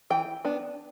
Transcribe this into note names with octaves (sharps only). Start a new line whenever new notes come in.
E3 G5
B3 D4